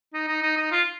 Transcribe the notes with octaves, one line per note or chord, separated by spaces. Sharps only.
D#4
D#4
D#4
D#4
F4